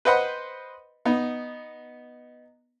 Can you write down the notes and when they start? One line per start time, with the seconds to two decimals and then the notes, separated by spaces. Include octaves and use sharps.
0.05 B4 C5 D#5 F#5 B5
1.05 B3 D#4